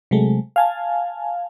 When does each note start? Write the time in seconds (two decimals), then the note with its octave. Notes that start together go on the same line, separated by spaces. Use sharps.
0.11 C3 F#3 G#3 A3
0.56 F5 G#5 A5